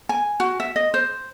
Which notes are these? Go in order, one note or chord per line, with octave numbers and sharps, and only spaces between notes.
G#5
F#4
E5
D#5
C5